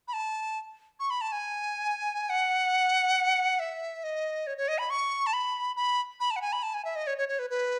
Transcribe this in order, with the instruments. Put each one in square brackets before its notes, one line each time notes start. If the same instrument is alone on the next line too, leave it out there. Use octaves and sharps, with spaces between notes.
[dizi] B5
A5
C#6
B5
A5
G#5
F#5
E5
D#5
C#5
C#5
D#5
B5
C#6
A5
B5
B5
B5
A5
F#5
G#5
B5
A5
G#5
E5
D#5
C#5
C#5
C#5
B4
B4